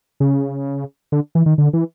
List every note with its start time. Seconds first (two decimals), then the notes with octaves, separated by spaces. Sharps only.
0.20 C#3
1.12 D3
1.35 E3
1.46 D#3
1.58 D3
1.73 E3